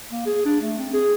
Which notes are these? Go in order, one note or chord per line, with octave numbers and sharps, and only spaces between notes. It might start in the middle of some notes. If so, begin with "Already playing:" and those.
A#3
G#4
D4
A3
C4
G#4